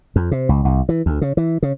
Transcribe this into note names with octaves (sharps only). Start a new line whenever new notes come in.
F2
C3
C#2
C2
E3
D2
C#3
E3
C#3